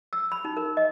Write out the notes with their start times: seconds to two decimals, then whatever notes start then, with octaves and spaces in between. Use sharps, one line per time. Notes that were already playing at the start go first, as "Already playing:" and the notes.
0.13 E6
0.32 B5
0.45 D#4
0.57 A#4
0.77 D#5